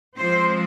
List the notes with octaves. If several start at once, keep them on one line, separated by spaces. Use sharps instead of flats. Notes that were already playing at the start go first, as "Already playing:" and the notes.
F3 G#3 C4 C5